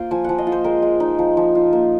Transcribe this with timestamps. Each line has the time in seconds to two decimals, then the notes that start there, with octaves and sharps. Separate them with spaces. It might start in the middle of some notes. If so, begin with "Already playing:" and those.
Already playing: A#3 F4 A#4 C5
0.11 F3 G#5
0.24 F3 F#5
0.38 D#5
0.47 F4
0.52 C5
0.64 G#3 A#4
0.82 G#3
1.00 D#4
1.19 F3
1.37 F3
1.55 F4
1.73 A#3